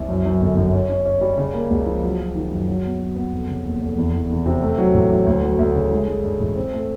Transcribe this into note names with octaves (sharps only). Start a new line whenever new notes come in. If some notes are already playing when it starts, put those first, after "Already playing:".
Already playing: C2
F#2
F#2
G1
F#2
C#4
C#4
C#4
G3
C#3
A#3
C#2
F3
F#3
F#3
D#3
F#2
F#3
B3
F#3
B3
F1
C#3
D#2
F1
E2
E2
E2
C3
A3
F#3
A1
F#3
D2
F#3
D2
C#3
G#3
G#3
G2
A1
C4
A3